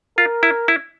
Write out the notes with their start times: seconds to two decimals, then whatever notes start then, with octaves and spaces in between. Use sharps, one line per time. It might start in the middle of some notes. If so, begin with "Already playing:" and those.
0.18 F4 A#4
0.43 E4
0.68 E4